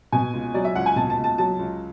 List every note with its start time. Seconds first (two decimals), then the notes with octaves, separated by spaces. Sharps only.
0.12 B2 G#5
0.34 C#2
0.54 F#3 D5
0.65 E5
0.75 C#2 F#5
0.86 G#5
0.96 B2 A5
1.10 A5
1.17 C#2
1.24 A5
1.38 F#3 A5
1.59 C#2